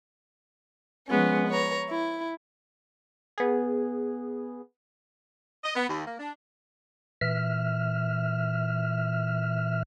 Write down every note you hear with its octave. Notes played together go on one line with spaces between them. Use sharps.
F3 G#3 B3 C#4
B4 C#5 A#5
E4
B3 G#4
D#5
B3
D#2
A#3
D4
A#2 E3 E5 F6